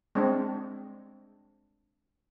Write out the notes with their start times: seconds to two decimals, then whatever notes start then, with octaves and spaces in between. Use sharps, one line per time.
0.15 G#3 C4 D4